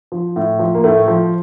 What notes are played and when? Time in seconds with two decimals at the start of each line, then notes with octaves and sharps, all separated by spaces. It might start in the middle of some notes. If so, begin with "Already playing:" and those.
0.12 F3
0.36 A2
0.59 F3
0.75 A#3
0.84 A2 A3
1.08 F3